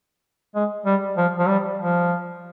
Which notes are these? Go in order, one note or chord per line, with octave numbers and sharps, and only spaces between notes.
G#3
G3
F3
F3
G3
F3